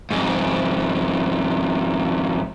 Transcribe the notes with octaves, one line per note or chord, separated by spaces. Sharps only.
F2 G#2